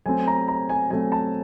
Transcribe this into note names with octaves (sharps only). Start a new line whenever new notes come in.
F#3 A3 C4 G#5
A#5
A#5
G#5
F#3 A3 C4 G#5
A5